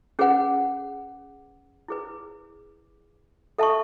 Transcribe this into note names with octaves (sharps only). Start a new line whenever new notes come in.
C#4 G#4 B4 F#5
E4 G#4 B4
A4 E5 A5 C#6